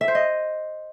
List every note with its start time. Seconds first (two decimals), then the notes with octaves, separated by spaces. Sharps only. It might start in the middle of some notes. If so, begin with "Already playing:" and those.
0.01 E5
0.08 C5
0.15 D#5